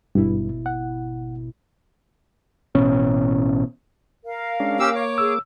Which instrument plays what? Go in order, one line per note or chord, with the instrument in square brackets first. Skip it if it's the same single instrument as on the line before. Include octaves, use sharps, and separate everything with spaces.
[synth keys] G#1 B2 E4 [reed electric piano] G2
[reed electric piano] F#5
[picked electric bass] A1 B2 C#4
[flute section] A#4 F5
[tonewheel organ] G#3 C#4 D4
[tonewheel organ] A#3 D6 [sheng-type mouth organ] C#4 G4 E6
[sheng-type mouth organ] C#5
[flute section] G#4 [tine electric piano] E6